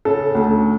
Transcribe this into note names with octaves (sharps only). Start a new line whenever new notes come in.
C#3 A4
D2